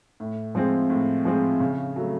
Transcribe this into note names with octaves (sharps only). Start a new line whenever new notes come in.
A2
F3 G#3 C4
A2
F3 G#3 C4
C#3
F#3 A3